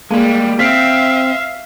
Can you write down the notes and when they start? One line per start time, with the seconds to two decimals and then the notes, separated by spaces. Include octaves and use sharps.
0.11 G3 G#3 A#3 G#4
0.59 C4 E5 F5 B6